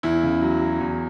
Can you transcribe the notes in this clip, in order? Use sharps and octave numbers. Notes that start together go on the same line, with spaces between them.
E2 E4
C#3
F#3
F#3
E2